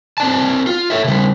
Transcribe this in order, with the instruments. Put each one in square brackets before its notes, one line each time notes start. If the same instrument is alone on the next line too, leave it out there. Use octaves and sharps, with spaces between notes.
[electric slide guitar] C4 D5 A5
F4
A4 C#5 E5
C#3 G3